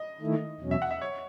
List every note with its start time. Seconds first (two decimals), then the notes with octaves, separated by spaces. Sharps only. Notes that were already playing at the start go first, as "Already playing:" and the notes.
Already playing: D#5
0.21 D#3 A3 E4
0.61 E2 B2 F#3 C#4
0.71 E5
0.82 F#5
0.91 E5
1.01 C#5